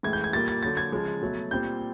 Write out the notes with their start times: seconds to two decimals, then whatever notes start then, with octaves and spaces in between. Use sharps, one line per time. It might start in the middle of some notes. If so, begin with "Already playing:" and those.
0.03 A2 E3 G#3 G#6
0.13 G6
0.24 G#6
0.33 A#2 G3 A#3 A6
0.48 A6
0.63 D3 F#3 A#3 A6
0.77 G#6
0.92 C#3 F3 G#3
1.22 B2 F#3 A3
1.51 A#2 G3 C4 G6